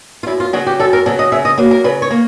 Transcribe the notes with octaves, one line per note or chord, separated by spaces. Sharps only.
F4
F#2 E4
F4
C#3 F#3 F#4
G4
F#2 A4
A#4
C#3 F#3 A4
D#5
C#3 E5
D#5
F#3 A#3
A#4
C#3 B4
C#5
A#3